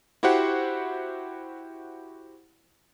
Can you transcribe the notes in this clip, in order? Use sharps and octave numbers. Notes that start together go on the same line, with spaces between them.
E4 F#4 G4 C5 F#5